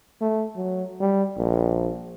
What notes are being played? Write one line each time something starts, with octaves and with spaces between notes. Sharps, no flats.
A3
F#3
G3
A#1